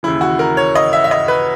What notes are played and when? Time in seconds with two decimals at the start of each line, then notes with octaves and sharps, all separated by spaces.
0.03 D#2 C#3 E3 E4
0.21 F#4
0.39 A#4
0.57 C#5
0.75 D#5
0.93 E5
1.04 E5
1.11 D#5
1.28 B4